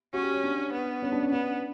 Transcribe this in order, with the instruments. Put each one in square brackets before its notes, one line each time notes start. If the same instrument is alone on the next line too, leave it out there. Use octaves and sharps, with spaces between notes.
[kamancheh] C#4 [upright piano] F#4
[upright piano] G4
C#5
D4
[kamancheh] B3
[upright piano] C#4
D4
C#4
[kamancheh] B3 [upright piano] D4